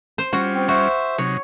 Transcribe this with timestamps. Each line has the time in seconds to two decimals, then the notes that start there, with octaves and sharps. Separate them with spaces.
0.18 C5
0.33 G3 C#4 F4 F#4
0.55 C4
0.68 F#4 C5 E5
1.18 C3 F#3 D#4 C#5